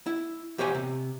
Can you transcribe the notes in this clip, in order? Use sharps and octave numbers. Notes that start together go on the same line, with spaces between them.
E4
E2 G4 C5 C#5 G#5
C3